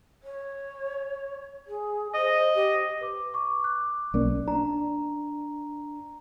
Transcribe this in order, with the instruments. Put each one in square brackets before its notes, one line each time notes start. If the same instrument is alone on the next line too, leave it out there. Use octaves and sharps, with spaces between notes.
[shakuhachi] C#5
G#4
[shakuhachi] C5 [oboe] D#5
[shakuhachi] G4
[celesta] B4 D6
C#6 D6
D6 F#6
[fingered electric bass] B1 A#3 C#4 [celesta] D5
[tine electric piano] D4 [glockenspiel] A#5